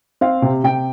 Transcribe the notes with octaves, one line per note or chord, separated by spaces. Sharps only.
C4 F5
C3
C3 G5